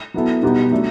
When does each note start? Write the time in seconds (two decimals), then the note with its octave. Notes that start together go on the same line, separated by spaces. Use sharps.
0.14 F#3 B3 E4 A4
0.43 B2 G3 B3 D#4 G4
0.71 F#3 A3 D4